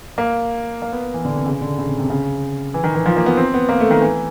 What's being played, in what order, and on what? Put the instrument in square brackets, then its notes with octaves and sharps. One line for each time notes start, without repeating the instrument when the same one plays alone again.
[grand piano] A#3
A#3
B3
E3
D3
C3
C#3
D3
C#3
C3
C3
C#3
E3
D#3
E3
F3
A#3
B3
C4
B3
A#3
A3
D#3
E3